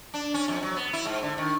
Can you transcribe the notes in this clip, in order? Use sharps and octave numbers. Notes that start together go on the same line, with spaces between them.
D4
C#4
F2
F#3
B3
E4
G#2
D3
D#3